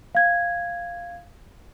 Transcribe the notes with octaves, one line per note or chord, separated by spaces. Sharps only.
F5 G#6